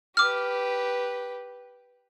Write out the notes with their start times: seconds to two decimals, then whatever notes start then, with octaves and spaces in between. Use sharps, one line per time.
0.17 G4 B4 D6 F6